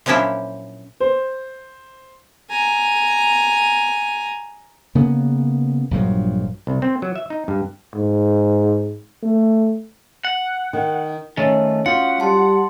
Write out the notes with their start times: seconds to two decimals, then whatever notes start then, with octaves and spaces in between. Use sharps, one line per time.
0.06 A#2 F3 F#3 C#4 D4 E4
1.00 C5
2.50 G#5 A#5
4.95 C#3 A#3 B3
5.91 A#1 G2 F3 F#3
6.67 C2
6.82 C4
7.02 F#3
7.16 E5
7.30 D#4
7.48 G2
7.95 G#2
9.23 A3
10.25 F#5
10.73 D#3
11.37 D#3 A3 C#4
11.86 C#4 F4 F#4 F5 F#5
12.20 G3 A5 C6